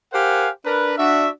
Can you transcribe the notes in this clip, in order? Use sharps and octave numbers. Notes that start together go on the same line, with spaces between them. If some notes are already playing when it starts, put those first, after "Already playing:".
G4 A#4 C5 F5 F#5 G#5
D4 A#4 B4
D4 F#4 E5